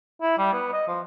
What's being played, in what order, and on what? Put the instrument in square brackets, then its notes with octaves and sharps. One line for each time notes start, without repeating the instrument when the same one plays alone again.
[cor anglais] E4
G3
B3
D#5
F3